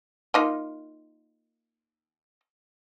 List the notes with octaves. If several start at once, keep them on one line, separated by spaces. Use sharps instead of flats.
A#3 D#4 F4